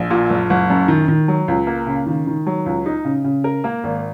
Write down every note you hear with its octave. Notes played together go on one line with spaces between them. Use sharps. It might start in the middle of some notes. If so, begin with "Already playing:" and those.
Already playing: A#1
A#2
F#1
F#1
F#2
D#3
D#3
F#3
C#2
A#3
C#3
D#3
D#3
F#3
C#2
D#4
C#3
C#3
A#4
A#3
G#1